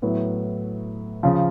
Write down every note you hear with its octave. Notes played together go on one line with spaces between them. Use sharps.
A2 F#3 B3 E4
C#3 F3